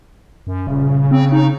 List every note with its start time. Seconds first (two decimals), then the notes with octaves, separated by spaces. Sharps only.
0.47 F#2
0.67 D#1 C#3
1.11 C4
1.32 D#4